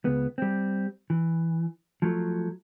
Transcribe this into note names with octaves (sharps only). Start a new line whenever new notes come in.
C#2 B3
G3 C4
E3
F3 F#3 A3